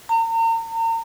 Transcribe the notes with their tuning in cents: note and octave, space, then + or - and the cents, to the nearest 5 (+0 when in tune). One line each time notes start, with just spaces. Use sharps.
A#5 -40